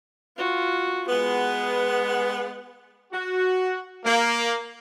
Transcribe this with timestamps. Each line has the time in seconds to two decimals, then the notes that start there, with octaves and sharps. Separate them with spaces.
0.37 F4 F#4
1.09 G#3 B3 B4
3.12 F#4
4.04 A#3